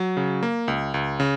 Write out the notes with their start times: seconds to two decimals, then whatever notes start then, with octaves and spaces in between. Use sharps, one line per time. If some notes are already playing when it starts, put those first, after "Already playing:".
Already playing: F#3
0.17 C#3
0.43 A#3
0.68 C#2
0.94 C#2
1.20 C#3